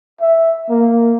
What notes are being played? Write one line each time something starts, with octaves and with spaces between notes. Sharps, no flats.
E5
A#3